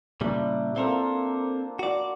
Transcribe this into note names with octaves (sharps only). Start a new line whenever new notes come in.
A#2 C#3 G3 D4 E4 A#4
A#3 C4 F4 A4 A#4
F#4 D5